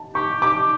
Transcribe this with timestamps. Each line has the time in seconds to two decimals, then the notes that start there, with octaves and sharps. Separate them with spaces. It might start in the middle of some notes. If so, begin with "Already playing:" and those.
Already playing: A5
0.15 G4 C#6
0.42 G4 D6